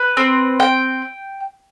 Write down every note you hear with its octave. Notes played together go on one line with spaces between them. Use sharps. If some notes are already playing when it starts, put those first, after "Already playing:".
Already playing: B4
C4
G5